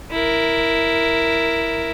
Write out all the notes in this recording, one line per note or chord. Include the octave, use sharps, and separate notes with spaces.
E4 A#4